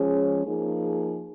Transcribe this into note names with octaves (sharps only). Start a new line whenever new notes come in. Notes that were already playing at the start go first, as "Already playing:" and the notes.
Already playing: F3 G#3 C#4 G#4
F3 A#3 D#4 G#4